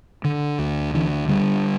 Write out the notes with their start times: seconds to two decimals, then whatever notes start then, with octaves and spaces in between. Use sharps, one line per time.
0.24 D3
0.58 D2
0.94 D3 E3
1.28 D3 G3